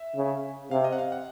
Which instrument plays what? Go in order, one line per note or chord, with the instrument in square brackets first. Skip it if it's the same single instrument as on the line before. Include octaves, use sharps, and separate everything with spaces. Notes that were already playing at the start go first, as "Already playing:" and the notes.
Already playing: [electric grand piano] E5
[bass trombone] C#3
[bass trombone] C3 [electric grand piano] F5
[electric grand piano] D#5
F#5
F5
F#5